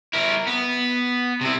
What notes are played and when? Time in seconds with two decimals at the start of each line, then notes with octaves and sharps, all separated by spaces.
0.13 E4 A#4
0.47 B3
1.41 C3 E4